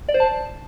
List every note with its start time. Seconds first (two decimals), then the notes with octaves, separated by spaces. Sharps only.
0.09 D5
0.14 C5
0.20 A5